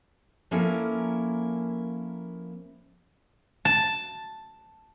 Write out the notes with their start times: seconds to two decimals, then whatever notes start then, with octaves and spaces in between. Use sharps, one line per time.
0.51 F3 A#3 C#4 E4 A4 A#4
3.65 A5